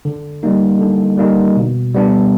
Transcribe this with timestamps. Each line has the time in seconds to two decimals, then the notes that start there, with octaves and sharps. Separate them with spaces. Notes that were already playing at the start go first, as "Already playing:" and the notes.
0.05 D3
0.43 G3 A#3 D#4
0.80 D3
1.18 G3 A#3 D#4
1.56 B2
1.94 G3 B3 D4